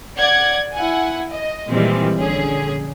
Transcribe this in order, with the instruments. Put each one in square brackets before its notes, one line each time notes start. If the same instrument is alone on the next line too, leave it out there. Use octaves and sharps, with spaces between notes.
[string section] D5 F#5 G#6
E4 F#5 G#5
D#5
A#2 D#3 E3 G3 G#3 C4
A#1 D3 C#4 G#4